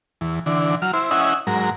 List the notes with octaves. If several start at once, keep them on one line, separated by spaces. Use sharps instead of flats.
E2
D3 E3
F#3 F6
E4 C5
C#4 E4 D#5 E5 F#5 G#5
G#2 F#3 A#4